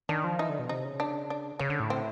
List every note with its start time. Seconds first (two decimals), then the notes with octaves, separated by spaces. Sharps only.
0.09 D#3 D4
0.24 F3
0.39 E3 D#4
0.49 D3
0.59 B2
0.69 C3 D#4
0.84 C#3
1.00 D4
1.30 D4
1.59 C#3 C#4
1.70 D3
1.80 A2
1.90 C4